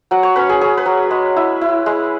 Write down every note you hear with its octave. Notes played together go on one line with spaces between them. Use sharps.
F#3 F#5
C#5
C#4 B4
G#4
C#4 G#4
B4
F#3
G#3
E4
E4
G#3